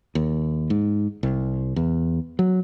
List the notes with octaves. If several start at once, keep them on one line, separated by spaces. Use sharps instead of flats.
D#2
G#2
C2
E2
F#3